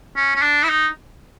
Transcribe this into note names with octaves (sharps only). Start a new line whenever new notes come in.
C#4
C#4
D4
E4
D#4